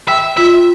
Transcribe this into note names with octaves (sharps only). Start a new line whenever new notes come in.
E5 G5
F4 E5